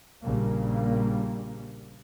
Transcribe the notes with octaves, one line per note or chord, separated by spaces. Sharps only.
A#1 A#2 C#3 G3 A#3